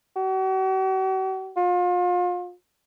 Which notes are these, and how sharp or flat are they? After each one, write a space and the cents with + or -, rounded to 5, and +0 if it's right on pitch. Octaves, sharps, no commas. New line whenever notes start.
F#4 +45
F4 +35